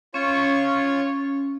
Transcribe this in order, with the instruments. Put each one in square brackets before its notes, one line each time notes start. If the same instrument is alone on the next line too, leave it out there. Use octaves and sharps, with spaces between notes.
[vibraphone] C#4 [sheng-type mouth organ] F4 C#5 C#6